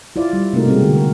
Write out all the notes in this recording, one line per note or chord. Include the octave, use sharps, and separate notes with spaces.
E4 F4 C5 D5 F5
G3
C3 A3 A#3 D#4 F#4 A#4
B2 G3 G#3 C4 F#4 G#4
D3 F#4
A#4